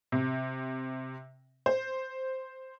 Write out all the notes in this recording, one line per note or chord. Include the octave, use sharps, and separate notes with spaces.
C3
C5